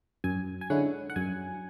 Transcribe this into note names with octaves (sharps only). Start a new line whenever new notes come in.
F#2 G#5
G#5
D3 G#3 C#4 E4 F#5
F#5
F#2 G#5